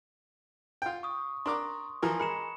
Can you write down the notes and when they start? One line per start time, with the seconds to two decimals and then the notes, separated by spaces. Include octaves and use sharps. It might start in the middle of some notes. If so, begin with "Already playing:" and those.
0.82 F4 G5
1.03 C#6 D#6
1.46 D4 A#4 C6 D6
2.03 E3 F3 A#4
2.19 G#3 A#4 B5 C#7 E7